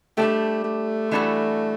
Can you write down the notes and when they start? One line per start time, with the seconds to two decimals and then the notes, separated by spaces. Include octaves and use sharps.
0.17 G3 A3 D4 G4
0.64 A3
1.11 E3 G3 D4 F#4 A4